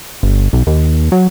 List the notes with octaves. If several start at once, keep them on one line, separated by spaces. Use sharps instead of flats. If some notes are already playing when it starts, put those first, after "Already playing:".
G1
B1
D#2
F#3